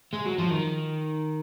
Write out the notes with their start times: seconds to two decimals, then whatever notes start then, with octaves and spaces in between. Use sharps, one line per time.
0.13 G#3
0.25 F#3
0.38 F3
0.50 D#3